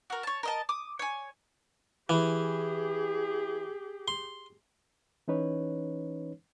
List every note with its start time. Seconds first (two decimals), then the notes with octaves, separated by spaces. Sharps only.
0.10 F#4 A#4
0.23 C#5 A5
0.43 A#4 D#5 A5
0.69 D6 D#6
0.99 C#5 G#5
2.09 E3 G4 G#4
4.08 C6
5.28 E3 C#4 D#4 B4 C#5